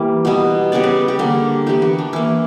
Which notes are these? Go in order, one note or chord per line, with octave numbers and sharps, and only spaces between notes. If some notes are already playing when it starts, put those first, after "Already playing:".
Already playing: E3 G3 A#3
B2 G3 B3
C#3 G3 B3 D5
B4
G4
D3 G3 A#3
E3 G3 B3 G4
F#4
D4
E3 A#3 E4